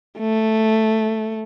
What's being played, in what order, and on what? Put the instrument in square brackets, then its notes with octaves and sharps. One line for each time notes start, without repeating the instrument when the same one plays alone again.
[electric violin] A3